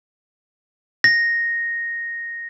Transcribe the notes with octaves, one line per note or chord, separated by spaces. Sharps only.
A#6